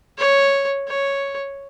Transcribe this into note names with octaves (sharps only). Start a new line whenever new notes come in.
C#5
C#5